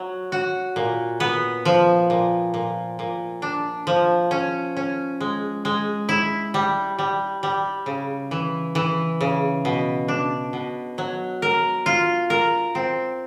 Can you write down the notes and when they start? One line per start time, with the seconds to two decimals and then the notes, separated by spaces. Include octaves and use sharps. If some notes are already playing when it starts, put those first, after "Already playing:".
Already playing: F#3
0.32 F#4
0.76 A#2
1.20 B3
1.65 F3
2.10 A#2
2.54 A#2
2.99 A#2
3.42 D4
3.87 F3
4.31 C#4
4.77 C#4
5.21 G#3
5.65 G#3
6.09 E4
6.54 G3
6.99 G3
7.43 G3
7.86 C#3
8.31 E3
8.75 E3
9.21 C#3
9.65 B2
10.08 D4
10.53 B2
10.98 F#3
11.42 A#4
11.86 F4
12.30 A#4
12.75 C4